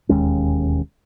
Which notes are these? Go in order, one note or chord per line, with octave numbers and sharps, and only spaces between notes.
E1 D#2 G#3 C#4